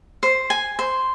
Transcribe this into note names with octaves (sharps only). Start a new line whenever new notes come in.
C5
G#5
C5